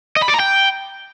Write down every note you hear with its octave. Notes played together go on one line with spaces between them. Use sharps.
D#5
B5
D5
A#5
G5